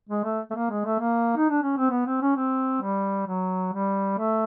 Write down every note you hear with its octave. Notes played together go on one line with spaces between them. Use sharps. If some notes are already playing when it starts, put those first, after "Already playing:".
G#3
A3
A3
A#3
G#3
A3
A#3
D#4
D4
C#4
C4
B3
C4
C#4
C4
G3
F#3
G3
A3